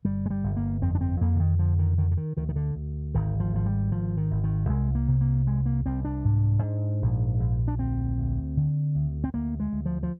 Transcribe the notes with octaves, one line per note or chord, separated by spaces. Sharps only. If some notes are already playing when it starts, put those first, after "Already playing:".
G1 G3
G#3
G3
G1
A#3
F2 C4
D4
C4
F2 A#3
D3
D#3
D3 F3
D#3
D3 D#3
D3
D#3
D2 D#3
D#3
D3
D2
G#1 D#3
F3
G#1 F3
G3
G#1 F3
D#3
G#1
D#3
C2 G#3
A#3
C3
A#3
C2 G#3
A#3
C2 C4
D4
G#2
G#2
A#1
A#1
D4
D2 C4
D2
D3
D2
C4
D2 A#3
G#3
D2
F3
F3